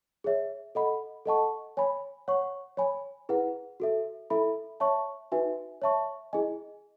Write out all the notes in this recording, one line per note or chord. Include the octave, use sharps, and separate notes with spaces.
G#4 C#5 E5
A4 D#5 F#5 B5
A4 D#5 F#5 A5 C#6
C#5 G#5 B5
C#5 F#5 C#6
C#5 G#5 B5
E4 G#4 B4 F#5
F#4 A4 E5
E4 A4 E5 B5
C#5 E5 A5 C#6
D#4 F#4 B4 E5 G#5
C#5 E5 A5 C#6
E4 G#4 D#5 G#5